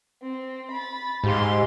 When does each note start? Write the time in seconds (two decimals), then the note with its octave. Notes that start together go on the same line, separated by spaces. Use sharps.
0.23 C4
0.71 B5 A6
1.24 G#2 G4 F5 C6